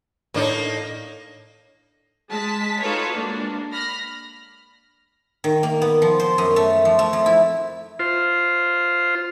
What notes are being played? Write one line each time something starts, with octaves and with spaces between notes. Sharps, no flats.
A2 A#3 D4 D#4
G#3 A5 B6
D#4 F4 F#4 A4 B4 C#5
G#3 A#3 D4
B5 F6 A#6
D#3
A#3
B3
F3
C5
F#2
A3
F3
A3
F2
E4
F4 C5